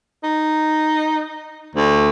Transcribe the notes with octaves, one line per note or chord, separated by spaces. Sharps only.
D#4
D2